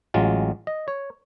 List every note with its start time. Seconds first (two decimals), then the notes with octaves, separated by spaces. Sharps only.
0.14 A1 F#3 G#3 F4
0.67 D#5
0.88 C#5